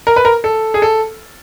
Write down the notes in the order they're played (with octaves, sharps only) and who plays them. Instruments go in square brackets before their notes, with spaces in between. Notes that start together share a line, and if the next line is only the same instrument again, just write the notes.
[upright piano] A#4
B4
A#4
A4
G#4
A4